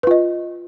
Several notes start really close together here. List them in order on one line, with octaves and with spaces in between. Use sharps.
B4 F4 D#5